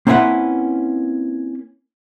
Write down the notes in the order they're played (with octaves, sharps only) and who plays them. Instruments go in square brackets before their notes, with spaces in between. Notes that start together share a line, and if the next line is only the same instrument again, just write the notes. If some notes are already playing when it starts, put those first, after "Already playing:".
[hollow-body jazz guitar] A#3 C4 C#4 E4 B4 F#5